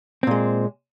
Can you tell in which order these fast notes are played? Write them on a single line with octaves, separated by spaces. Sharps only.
C4 A#2 G#3